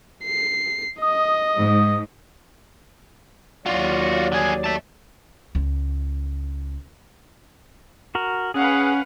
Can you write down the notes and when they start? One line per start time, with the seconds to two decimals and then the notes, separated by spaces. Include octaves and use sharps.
0.25 C7
1.02 D#5 D#6
1.60 G#2
3.66 D#2 F#3 F4 F#4 D5
4.32 D3 G#4
4.64 E5 A5
5.55 C#2
8.15 F#4 A#4
8.54 C#4 G#4 B4 F5 F#5